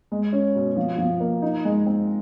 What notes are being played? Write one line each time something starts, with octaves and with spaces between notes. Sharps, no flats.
G#3
C#4
B2
F3
F3
A#3
D#4
G#3
C4